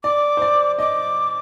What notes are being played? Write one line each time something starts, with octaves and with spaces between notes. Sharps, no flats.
D5 D6
C5
D5
D#5 D6